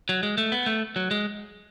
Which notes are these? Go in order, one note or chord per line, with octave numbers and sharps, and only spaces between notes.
F#3
G#3
A3
B3
A3
F#3
G#3